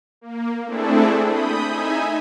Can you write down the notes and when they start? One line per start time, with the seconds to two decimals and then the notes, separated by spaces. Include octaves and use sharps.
0.21 A#3
0.65 A3 C4 D4 E4 G#4 A4
1.26 B5 D#6 G6
1.64 D#4 E5 G#5